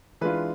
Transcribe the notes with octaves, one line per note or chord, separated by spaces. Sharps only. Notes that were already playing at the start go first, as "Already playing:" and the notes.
E3 G#3 D4 F4 B4